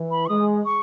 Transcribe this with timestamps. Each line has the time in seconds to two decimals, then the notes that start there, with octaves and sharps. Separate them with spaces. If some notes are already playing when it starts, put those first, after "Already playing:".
Already playing: E3
0.11 B5
0.26 C#6
0.29 G#3 D#6
0.65 C#6